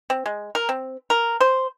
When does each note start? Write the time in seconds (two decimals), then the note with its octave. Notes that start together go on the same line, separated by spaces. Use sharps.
0.10 C4
0.26 G#3
0.55 A#4
0.69 C4
1.10 A#4
1.40 C5